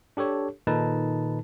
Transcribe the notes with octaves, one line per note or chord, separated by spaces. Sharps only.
D4 G4 A4 C#5
A#2 D#3 D#4 A4 B4 A5